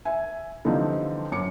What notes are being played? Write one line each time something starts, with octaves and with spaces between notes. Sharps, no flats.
E5 G#5
D3 E3 F3 G3 C4 D#4
F#2 D6 C#7